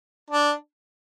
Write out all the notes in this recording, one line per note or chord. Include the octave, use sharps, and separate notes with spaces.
D4